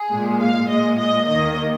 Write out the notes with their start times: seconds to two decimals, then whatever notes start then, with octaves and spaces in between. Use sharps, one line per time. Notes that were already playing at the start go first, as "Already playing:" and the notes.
Already playing: G#4
0.12 A#2 G#3
0.41 F5
0.70 A#2 G#3 D#5
0.99 D#5
1.29 D#2 D#3 A#3 D#5